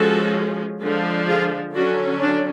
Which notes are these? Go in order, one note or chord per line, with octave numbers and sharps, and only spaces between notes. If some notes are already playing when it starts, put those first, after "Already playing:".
Already playing: F3 G#3 C#4 F#4 A4
D3 F3 G#3 D4
F4 G#4
D3 F#3 C#4 D4 F#4
D4